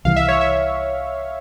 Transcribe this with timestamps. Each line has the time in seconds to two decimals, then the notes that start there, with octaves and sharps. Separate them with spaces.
0.05 C2 C3 E3 F5
0.16 E5
0.28 C#5
0.41 E5